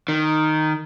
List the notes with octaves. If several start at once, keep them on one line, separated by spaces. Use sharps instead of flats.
D#3